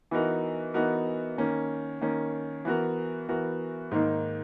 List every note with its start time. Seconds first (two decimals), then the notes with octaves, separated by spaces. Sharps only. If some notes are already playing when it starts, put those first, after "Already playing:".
0.11 E3 B3 D#4 F#4 A#4
0.74 E3 B3 D#4 F#4 A#4
1.38 D#3 A#3 C#4
2.01 D#3 A#3 C#4
2.65 E3 B3 F#4 A#4
3.29 E3 B3 F#4 A#4
3.91 G#2 D#3 A#3 D#4